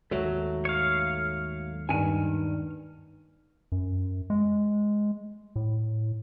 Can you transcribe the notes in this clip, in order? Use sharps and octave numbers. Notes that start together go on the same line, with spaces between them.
D#2 G#2 F#3 A3
C#5 F5
G2 D#3 G#5 D#7
F#2
G#3
A2